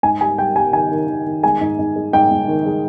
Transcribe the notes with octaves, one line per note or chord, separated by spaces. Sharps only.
G#2 G#5
G3 G#5
G3 G5
G3 G#5
D#3 G#5
D#3
D#3
D#3
G#3 G#5
G#2
G#2
G#3
G#2 G5
G#2
D#3
G#3